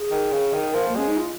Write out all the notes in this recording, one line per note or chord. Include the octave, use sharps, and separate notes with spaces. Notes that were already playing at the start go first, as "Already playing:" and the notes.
Already playing: G#4
D#3
C#3
D#3
F3 A#4
A#3
G#3 C#4
D#4
F4